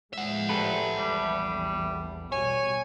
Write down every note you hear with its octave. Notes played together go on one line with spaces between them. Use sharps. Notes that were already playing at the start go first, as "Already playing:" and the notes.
A2 F3 G#3 E5 F#5
G4 A4 B4
A#1 E2 G3
B2 G3 C#5 G#5